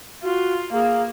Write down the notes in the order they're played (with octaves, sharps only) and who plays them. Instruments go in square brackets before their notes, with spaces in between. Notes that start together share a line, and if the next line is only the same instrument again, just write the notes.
[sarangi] F4 [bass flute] F#4
[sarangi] A#3 [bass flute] G#4 [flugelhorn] F5